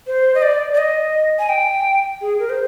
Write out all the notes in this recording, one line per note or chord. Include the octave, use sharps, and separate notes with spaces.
C5
D#5
D5
D5
D#5
G#5
G5
G#4
A#4
C5